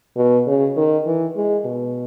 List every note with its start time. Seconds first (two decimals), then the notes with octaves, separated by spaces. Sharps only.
0.17 B2
0.47 C#3
0.77 D#3
1.06 E3
1.36 G#3
1.65 B2